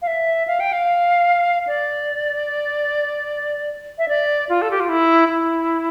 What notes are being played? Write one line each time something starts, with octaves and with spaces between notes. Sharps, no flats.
F5
E5
F5
G5
F5
D5
E5
D5
F4
A4
G4
F4
E4
E4